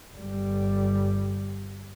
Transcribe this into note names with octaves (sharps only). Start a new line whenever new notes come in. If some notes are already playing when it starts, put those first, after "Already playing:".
G1 G3